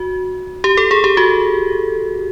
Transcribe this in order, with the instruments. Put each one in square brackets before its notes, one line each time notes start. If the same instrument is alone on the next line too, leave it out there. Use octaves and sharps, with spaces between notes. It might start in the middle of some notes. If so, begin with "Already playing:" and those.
Already playing: [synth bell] F#4
G4
A4
G#4
G4
F#4